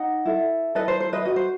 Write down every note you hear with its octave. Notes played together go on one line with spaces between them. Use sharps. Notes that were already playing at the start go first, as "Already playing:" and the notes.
Already playing: D#4 D#5 F#5
E4 A4
E4 A4 B4 D#5
C5
C5
B4 D#5
F#4 B4 D#5
C5